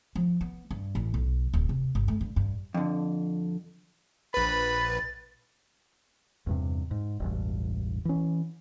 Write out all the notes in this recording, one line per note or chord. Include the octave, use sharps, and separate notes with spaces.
F3
B3
G2
A1
B1
D1
C3
G1
A3
G2
G2
F2 D3
A#1 B4 B5 A6
E2 G2 C3
G#2
E1 A1 G2
E3 C#4